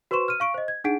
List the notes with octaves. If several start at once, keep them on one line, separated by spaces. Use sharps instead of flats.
F#4 B4 C5 C6 C#6 E7
F6 D#7
F5 C#6 D7
C5 D#5
G#6
D4 D#4 G#4 F#5 B6 D7